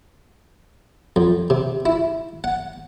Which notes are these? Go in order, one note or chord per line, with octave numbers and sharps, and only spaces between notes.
F2
C3
E4
F#5